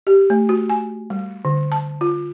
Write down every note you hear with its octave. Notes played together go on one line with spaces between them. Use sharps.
G4
A3
F#4
G#5
G3
D3
A5
F4